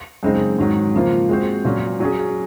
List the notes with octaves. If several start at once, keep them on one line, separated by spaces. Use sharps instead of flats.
F#2 C#3 G#3 C4 D#4
G#2 D#3 F#3
C#3 F3 A#3 F4 C5
G#3 C4 F#4 C5
A#2 F#3 C#4
F#3 C#4 G#4